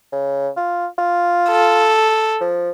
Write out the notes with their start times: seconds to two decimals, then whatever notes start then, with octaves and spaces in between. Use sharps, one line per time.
0.12 C#3
0.57 F4
0.98 F4
1.50 A4
2.40 F3